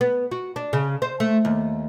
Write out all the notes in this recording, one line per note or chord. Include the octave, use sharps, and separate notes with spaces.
B3
F#4
D4
C#3
C5
A3
D#2